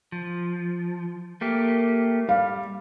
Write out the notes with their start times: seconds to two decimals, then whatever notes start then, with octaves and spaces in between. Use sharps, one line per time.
0.12 F3
1.41 A3 A#3 G4
2.29 G3 F5